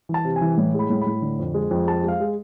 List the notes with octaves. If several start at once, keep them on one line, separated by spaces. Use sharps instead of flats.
E3
A5
C3
G#5
E3
A2
G#3 B5
A2
B5
A2
D3
F2
G#3
F2
G#3 A5
G#3 F5
G#3